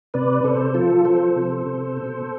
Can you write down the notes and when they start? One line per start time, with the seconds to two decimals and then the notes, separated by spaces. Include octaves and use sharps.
0.14 C3 B4 D5
0.44 C3 A4 C5
0.74 F3 F4 A4
1.05 F3 A4 C5
1.36 C3
1.66 C3
1.97 B2